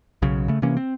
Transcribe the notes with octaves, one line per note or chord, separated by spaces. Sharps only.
B1 C#3 F#3
C#3 A3
C3 E3 A#3 C#4
C4